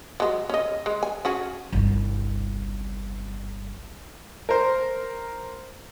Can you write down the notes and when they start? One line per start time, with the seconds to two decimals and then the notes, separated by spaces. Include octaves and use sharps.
0.20 F#3 G#3
0.49 C#4 D#5
0.86 G#3
1.03 G#5
1.25 C#4 F#4 G#4
1.72 G1 C2
4.49 A#4 C5